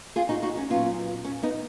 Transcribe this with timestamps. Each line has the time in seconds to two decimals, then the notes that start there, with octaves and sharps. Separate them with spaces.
0.16 F4 G#4
0.29 D#4 F#4
0.42 D#4 F#4
0.57 C#4
0.70 A#2 F#3 B3 C#4 F4
1.25 C#4
1.43 B3 D#4